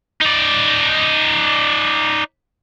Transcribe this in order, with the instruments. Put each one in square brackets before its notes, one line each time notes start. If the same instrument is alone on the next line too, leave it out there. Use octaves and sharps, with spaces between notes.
[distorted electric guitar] D#4 D5